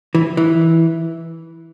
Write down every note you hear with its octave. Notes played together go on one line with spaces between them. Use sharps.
E3
E3